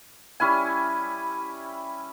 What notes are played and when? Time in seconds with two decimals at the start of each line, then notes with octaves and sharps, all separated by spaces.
0.40 G3 C#4 E4 G#5